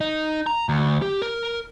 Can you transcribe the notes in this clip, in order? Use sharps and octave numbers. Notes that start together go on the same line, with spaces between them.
D#4
A#5
D2
G4
A#4